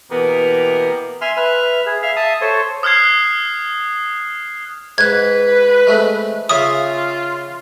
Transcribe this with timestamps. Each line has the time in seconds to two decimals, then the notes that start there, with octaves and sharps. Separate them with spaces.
0.10 B2 E3 A#3 B3 G4 A#4
1.21 E5 G#5 C6 F6
1.37 B4 E5 F6
1.86 G#4
2.02 E5 F5 F6
2.16 E5 A5 D#6
2.41 A4 C5 C#5
2.83 D#6 F6 F#6 G#6 C7
4.98 G#2 B4 F#6 G#6
5.87 G#3 A3 C4
6.49 C#3 F4 E5 G#5 D#6